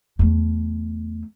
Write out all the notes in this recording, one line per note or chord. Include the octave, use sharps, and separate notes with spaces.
E2 A3